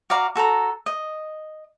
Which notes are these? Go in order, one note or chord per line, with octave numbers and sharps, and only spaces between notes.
F#4 D5 F5 A#5
F#4 A4 A5 A#5
D#5